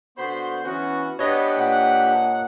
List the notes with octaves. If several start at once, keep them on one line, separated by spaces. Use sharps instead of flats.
D3 B3 F#4 C5 B5 C6
E3 B3 C#4 F#4
B3 D4 G4 B4 C#5 D#5
A#2 F#5